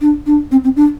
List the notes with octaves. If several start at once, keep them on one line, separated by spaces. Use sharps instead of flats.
D4
D4
C4
C4
D4